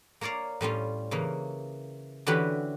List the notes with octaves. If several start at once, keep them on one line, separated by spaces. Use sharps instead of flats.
A#3 A#4 C#5 D5 F5
A2 G3 C#4 F4
C#3 E3 A#3
D3 E3 C#4 F#4 G4 B4